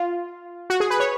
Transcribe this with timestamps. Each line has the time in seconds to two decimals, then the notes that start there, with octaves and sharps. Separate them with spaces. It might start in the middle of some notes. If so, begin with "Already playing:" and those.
Already playing: F4
0.70 F#4
0.80 G#4
0.91 B4
1.00 C#5